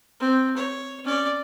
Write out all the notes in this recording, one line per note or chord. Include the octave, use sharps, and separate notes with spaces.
C4
C#5
C#4 D5